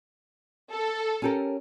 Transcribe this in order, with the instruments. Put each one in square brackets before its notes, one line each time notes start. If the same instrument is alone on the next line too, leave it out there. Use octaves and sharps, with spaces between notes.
[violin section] A4
[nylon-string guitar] C#4 G4 A#4